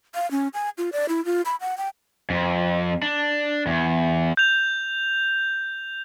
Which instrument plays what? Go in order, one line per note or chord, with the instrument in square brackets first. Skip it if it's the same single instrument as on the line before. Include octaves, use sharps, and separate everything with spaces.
[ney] F5
C#4
G#5
F4
D5
E4
F4
B5
F#5
G5
[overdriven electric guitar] F2
D4
E2
[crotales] G6 F7